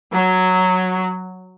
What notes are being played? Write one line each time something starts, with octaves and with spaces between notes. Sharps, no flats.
F#3